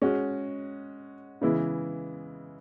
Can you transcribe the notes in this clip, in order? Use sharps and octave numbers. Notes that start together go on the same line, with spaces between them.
G#3 C#4 F#4
C#3 E3 G#3 B3 E4